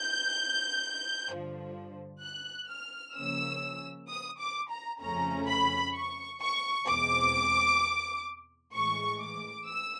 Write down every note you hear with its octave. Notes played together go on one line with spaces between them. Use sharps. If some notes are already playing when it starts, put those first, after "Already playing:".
Already playing: G6
G2 D3 F3
F#6
F6
C#3 F3 A#3 C#4 E6
D#6
D6
A#5
F2 C#3 F3 A3 C#4 A#5
B5
C#6
C#6
E2 B2 G#3 C4 D6
A2 E3 G#3 C#6
D6
E6